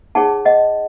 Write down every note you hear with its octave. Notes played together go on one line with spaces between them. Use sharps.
D#4 G#4 C#5 F#5 A5
D#5 F#5